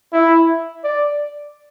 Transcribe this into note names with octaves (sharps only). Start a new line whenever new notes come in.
E4
D5